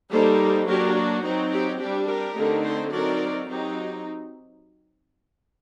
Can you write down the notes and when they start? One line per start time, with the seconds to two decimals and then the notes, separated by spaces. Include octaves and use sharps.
0.11 G3 A#3 D#4 A4 C5
0.67 F#3 A#3 D4 G4 A#4
0.95 F#4
1.23 F#3 C4 D#4
1.52 G4
1.79 G3 D4 G4
2.08 G4 A#4
2.36 D3 A3 C4 D#4
2.63 A4 C5
2.92 F#3 C4 D#4 A#4 D5
3.48 F#3 C4 D#4 G4